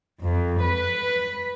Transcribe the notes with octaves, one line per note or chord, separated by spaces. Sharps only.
F2
B4